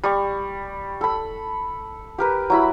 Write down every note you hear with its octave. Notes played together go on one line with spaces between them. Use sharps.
G3 C#6
A4 B5
G4 A#4 B4
F#3 E4 B5